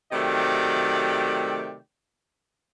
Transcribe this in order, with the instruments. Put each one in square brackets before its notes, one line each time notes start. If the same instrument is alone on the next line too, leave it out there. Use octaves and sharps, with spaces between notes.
[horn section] C3 D#3 F#3 A3 D5 G5